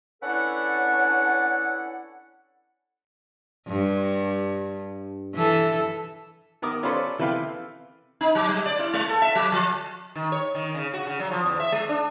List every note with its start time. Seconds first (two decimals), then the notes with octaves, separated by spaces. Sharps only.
0.22 C#4 D4 E4 A4 B4 F#5
3.68 G2
5.35 E3 A4
6.62 D#3 B3 A#4 D6 D#6
6.83 C#4 F4 A4 B4 C5 D5
7.19 C3 E3 A4 B4 F5 G5
8.21 D#4
8.35 F#3
8.49 G3
8.66 D5
8.79 E4
8.93 G#3
9.08 A4
9.22 E5
9.35 F#3
9.52 F3
10.15 D#3
10.32 C#5
10.55 D#3
10.75 C#3
10.94 F#4
11.07 C#3
11.19 F#3
11.31 F3
11.46 E2
11.60 E5
11.72 G#3
11.89 D4